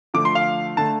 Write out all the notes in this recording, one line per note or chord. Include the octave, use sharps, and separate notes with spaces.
D3 F3 A3 D6
C6
F5
D3 A3 A5